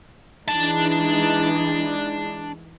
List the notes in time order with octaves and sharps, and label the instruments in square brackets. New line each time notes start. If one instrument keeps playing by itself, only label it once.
[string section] E3 G#3 D#4 [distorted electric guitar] D4 A5